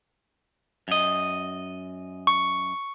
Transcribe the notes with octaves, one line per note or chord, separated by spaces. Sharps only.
F#2 D#5
C#6